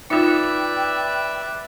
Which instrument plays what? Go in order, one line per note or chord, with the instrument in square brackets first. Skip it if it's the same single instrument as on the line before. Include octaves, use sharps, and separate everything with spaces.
[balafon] D#4 F4 [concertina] B4 D5 [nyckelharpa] E5 [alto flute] G5